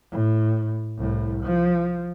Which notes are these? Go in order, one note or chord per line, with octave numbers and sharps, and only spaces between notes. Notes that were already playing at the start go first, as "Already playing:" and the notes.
A2
C2 A2
F3